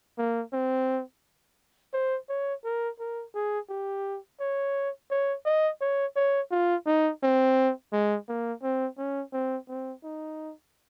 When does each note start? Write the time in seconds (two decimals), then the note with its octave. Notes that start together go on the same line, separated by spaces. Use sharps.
0.18 A#3
0.52 C4
1.93 C5
2.29 C#5
2.64 A#4
2.99 A#4
3.34 G#4
3.69 G4
4.40 C#5
5.11 C#5
5.45 D#5
5.81 C#5
6.16 C#5
6.51 F4
6.86 D#4
7.23 C4
7.92 G#3
8.28 A#3
8.63 C4
8.98 C#4
9.33 C4
9.68 C4
10.04 D#4